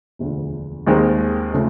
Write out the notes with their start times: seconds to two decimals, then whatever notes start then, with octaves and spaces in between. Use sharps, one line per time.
0.19 E1 D2 D3 F3
0.87 D#2 D#3 G#3 C4
1.54 C#3 F3 A3